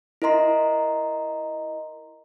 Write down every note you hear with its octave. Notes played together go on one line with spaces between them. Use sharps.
E4 A#4 D#5 A#5 C6